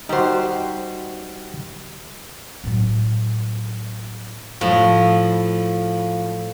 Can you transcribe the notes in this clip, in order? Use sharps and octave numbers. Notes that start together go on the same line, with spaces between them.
G3 D#4 F#4 C5
A2 F#3
A2 F3